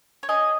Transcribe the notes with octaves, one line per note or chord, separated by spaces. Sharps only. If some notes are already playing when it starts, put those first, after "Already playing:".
C#5
C#4 G#4 D#5